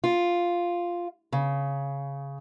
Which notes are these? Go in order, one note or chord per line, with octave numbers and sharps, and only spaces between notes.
F4
C#3